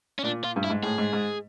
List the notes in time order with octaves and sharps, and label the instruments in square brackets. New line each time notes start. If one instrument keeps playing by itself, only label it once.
[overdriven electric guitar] C#4
[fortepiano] A#2 [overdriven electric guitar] D4
[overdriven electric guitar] F4
[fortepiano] G2
[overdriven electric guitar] E4
[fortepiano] G#2
[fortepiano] A2 [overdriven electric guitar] G#4
[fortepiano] G#2
G#2